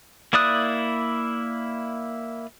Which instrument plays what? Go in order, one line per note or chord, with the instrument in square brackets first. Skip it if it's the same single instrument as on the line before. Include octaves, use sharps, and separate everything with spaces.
[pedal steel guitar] A#3 E4 D5 D#6 F#6